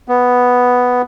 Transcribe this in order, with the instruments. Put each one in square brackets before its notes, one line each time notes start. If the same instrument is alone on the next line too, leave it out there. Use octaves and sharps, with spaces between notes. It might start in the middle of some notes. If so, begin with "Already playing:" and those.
[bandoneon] B3